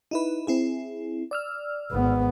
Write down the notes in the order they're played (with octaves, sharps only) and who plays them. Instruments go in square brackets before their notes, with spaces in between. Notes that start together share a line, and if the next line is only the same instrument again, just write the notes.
[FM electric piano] D#4 E4 B4
C4 E4 G#4
D5 E6 F6
[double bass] G#1 B3